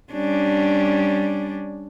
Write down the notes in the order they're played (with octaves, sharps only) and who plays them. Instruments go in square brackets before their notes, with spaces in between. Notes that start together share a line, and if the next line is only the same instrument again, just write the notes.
[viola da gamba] G3 C#4 D4